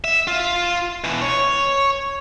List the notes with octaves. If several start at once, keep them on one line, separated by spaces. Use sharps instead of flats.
E5
F4
B2 E3
C#5